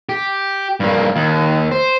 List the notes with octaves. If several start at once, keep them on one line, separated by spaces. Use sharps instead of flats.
G4
G2 A#3
D#2
C5